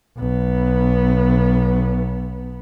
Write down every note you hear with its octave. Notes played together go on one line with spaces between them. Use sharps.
B1 B3